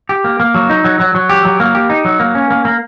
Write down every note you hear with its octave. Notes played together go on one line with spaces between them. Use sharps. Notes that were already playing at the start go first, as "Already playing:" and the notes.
G4
A#3
A#3
F#3
D#4
F#3
F#3
F#3
G4
F#3
A#3
G4
D#4
F#3
A#3
C#4
A#3
A#3